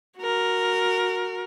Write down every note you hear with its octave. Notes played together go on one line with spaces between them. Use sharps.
F#4 A#4